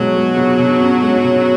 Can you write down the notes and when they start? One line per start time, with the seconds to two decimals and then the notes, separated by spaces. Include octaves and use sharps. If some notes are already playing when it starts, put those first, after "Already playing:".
Already playing: B2 F#3 G#3
0.15 G#3
0.37 B2
0.58 B2
0.80 C#4
1.02 G#3
1.23 B2